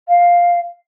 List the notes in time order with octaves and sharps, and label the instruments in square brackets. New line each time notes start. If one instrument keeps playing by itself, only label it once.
[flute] F5